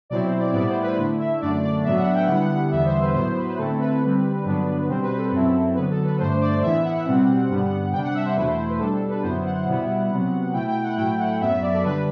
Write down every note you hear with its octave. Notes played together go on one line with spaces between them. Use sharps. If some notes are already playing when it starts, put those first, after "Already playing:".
B2 F#3 C4 E4 D5
C5
D5
A2 G3 B3 E4 D5
C5
B4
D3 A3 E4
E5
F#2 D3 A3 D4 D5
D5
A2 F#3 B3 D4 E5
F#5
G5
D3 G3 B3 E4 F#5
F#5
E2 D3 G3 B3 E5
C5
B4
A2 F#3 B3 E4 C5
B4
B4
D3 A3 C4 E4 A4
B4
D3 G3 C4
G2 D3 F#3 B3 D4
B2 G3 C4 C5
B4
A4
F#2 F#3 C4 E4
D3 F#3 B3 B4
A4
B4
G2 D3 A3 D4 C5
D5
A2 E3 B3 E4 E5
F#5
B2 G3 C4
G2 D3 G3 B3
C3 G3 D4 G5
F#5
E5
C5
E2 B2 A3 E4 B4
C5
C5
B4
B2 G3 D4 A4
A4
B4
F#2 D3 F#3 B3 E4 C5
F#5
B2 G3 B3 E4
C3 F#3 B3
B2 A3 E4 G5
G5
F#5
A2 F#3 A3 E4 G5
F#5
F#2 F#3 B3 E5
D5
A4
D3 G3 D4 B4